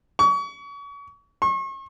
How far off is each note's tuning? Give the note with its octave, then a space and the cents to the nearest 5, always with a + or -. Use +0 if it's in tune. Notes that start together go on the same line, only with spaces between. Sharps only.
C#6 +35
C#6 -40